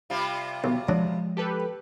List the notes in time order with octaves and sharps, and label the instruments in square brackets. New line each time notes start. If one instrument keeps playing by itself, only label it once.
[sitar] C3 G3 F4
[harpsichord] B1
[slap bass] F3 G#3 [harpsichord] F#3 D4
[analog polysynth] G4 A4 B4